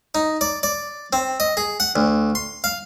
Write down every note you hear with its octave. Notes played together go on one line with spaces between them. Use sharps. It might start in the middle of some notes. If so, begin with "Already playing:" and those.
D#4
D5
D5
C4
D#5
G#4
F#5
D2
C6
F5